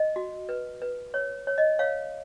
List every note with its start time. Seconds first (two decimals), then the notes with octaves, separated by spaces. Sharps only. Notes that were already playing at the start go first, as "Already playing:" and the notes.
Already playing: D#5
0.16 F#4
0.49 B4
0.82 B4
1.14 C#5
1.47 C#5
1.58 D#5
1.79 C#5 F5